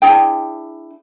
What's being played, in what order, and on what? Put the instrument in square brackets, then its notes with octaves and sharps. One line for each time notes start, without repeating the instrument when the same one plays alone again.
[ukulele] D4 E4 G#4 G5